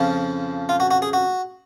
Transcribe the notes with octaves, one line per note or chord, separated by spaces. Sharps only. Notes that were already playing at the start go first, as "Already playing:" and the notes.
Already playing: F2 C#3 F3
F4
F#4
F#4
G#4
F#4